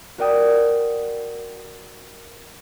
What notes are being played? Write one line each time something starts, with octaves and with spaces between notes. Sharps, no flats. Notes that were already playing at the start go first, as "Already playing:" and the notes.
F#4 A#4 D5 G5 D#6